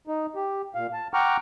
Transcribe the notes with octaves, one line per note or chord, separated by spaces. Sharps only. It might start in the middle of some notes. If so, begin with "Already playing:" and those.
D#4
G4
A#2 F5
A5
F#5 G5 A#5 C#6 D6 F6